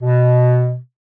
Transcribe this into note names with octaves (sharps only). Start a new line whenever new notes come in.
B2